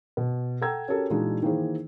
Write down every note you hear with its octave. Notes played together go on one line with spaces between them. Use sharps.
B2
A4 F#5 G5 A#5 E6 G#6
C#4 F#4 G4 A4 A#4
A#2 E3 G#3 D4 D#4 F#4
D#3 E3 A#3 G#4 C5